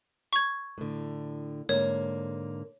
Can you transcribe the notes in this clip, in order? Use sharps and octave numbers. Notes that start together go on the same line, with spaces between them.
C#6 G#6
A2 D3
G#2 D3 A#3 C#5